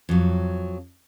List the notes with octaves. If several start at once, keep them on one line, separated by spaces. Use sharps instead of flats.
F2 F#3